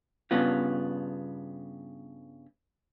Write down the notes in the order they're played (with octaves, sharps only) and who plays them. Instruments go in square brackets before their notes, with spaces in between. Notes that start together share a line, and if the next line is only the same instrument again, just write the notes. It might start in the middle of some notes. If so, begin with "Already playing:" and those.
[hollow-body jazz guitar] G2 C#3 B3 F4